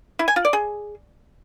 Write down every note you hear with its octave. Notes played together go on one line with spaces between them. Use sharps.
E4
G#5
F4
D5
G#4